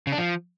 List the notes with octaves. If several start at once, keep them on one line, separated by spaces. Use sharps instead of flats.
C#3
D4
F3